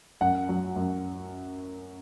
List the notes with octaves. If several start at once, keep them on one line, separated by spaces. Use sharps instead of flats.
F#2 F#5
F#3
F#2